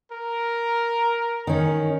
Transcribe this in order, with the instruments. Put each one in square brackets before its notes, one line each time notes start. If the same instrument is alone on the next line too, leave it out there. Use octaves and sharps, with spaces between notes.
[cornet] A#4
[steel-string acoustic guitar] D#3 C#4